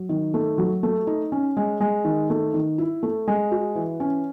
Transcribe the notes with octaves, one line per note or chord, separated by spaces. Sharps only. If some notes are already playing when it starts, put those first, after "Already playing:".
Already playing: F#3
D#3
A3
F#3
A3
D#4
C#4
G#3
G#3
D#3
A3
D#3
E4
A3
G#3
F#4
E3
C#4